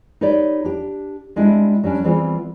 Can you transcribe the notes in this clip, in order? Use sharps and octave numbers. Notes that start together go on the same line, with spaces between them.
D#4 G4 B4 C#5 D5
D4 G4
G3 G#3 C4 D4 E4
F#3 G3 C#4 D4
E3 G3 B3 C4 F4 G#4